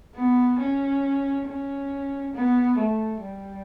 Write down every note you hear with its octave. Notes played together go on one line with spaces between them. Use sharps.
B3
C#4
C#4
B3
A3
G3